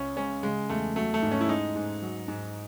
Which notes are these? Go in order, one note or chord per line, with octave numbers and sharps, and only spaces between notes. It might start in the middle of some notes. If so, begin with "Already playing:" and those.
Already playing: C#2 C#4
G#3 C#4
C#3 G#3
E2 A3
F#3 A3
A3
G#2
C#4
E4
G#3 D#4
G#2
F#3
G#2